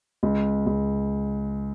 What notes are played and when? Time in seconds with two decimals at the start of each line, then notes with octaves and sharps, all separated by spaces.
0.23 C#2
0.66 C#2